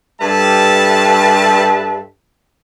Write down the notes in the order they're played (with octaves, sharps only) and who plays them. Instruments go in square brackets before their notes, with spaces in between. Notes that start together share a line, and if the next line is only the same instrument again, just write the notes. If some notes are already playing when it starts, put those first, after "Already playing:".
[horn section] G2 G3 A4 B4 E5 A5